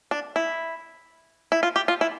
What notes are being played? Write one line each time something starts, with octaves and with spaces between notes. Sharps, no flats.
D4
E4
E4
F4
G4
F4
E4